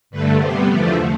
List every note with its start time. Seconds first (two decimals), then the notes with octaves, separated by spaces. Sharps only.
0.10 G2 D3 A3 B4
0.40 C3 G3 B3 C5
0.69 E2 D3 F3 A3 D5